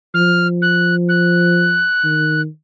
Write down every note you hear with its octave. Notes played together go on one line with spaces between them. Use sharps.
F3 F6
F#6
F#6
D#3